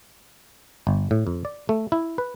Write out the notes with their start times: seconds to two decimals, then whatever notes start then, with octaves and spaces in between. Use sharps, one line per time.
0.87 G1
1.11 A2
1.27 F2
1.45 D5
1.69 A3
1.92 E4
2.18 B4